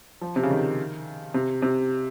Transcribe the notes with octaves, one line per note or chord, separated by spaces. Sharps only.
F3
C3
C#3
D#3
C3
C3